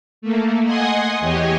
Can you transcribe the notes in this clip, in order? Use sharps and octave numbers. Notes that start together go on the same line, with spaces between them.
A3 A#3
D#5 F#5 G#5 C6 D#6 G#6
E2 G4 C#5 D#5 G#5